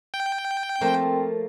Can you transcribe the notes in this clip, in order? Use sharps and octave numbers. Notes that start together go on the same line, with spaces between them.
G5
F3 A3 A#3 C4